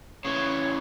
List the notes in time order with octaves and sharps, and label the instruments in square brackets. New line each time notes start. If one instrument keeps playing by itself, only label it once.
[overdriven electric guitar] C#3 E3 [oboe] C#5